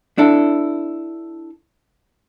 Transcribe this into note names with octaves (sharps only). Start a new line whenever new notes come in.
D4 E4 A4